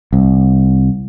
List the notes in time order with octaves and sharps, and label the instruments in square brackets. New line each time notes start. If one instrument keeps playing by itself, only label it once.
[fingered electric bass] C2